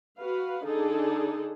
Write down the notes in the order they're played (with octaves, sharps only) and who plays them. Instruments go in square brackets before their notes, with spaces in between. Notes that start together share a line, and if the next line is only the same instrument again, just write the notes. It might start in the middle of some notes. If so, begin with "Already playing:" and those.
[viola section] F#4 B4 F5
D3 D4 D#4 G#4 A4